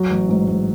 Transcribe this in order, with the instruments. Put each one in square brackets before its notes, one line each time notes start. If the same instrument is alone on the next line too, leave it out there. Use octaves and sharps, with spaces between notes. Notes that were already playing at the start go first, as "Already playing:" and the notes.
Already playing: [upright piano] F#3
A1
G#2
G#2